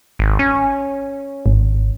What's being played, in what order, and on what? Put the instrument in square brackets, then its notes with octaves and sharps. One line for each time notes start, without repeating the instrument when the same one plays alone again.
[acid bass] G#1
C#4
[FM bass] G#1